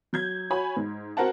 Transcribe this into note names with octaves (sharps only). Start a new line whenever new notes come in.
F#3 G6 G#6
F#4 C#5 G#5 B5
G#2
C4 F#4 A#4 F#5 A5